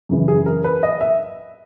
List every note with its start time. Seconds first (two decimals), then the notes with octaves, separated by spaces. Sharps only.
0.09 F#2 C#3 E3
0.28 G#4
0.46 A#4
0.64 B4
0.83 D#5
1.01 E5